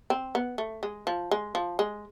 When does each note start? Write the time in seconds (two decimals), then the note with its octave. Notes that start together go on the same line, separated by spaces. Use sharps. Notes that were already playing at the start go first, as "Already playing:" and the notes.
0.10 C4
0.35 B3
0.58 A3
0.83 G#3
1.07 F3
1.31 G#3
1.55 F3
1.79 G#3